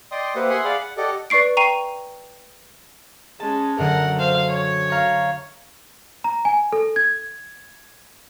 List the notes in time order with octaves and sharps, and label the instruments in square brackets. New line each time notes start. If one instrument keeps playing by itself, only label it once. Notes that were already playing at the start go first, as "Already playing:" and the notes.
[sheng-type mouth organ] D5 D#5 G5 C6 D#6
A#3 G4 B4 C5 E5 F#5
E5 F#5 G#5 C6 D#6 F#6
G#4 D5 F5 F#5 B5
F#5
G4 A4 D5 D#5 F#5
[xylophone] B4 D5 C#6 C7 D7
G5 A#5 C#6 C7 D#7
[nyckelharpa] G#3 C#4 [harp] A5
[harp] F#2 D3 [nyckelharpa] A#4 F#5
[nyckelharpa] C5 F5
C#5
[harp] F5 A#5 C#6
[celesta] A#5
G#5
A4
G#6